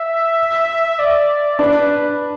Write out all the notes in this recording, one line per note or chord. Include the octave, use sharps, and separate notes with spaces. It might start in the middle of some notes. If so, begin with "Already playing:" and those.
Already playing: E5
D5
D4 B4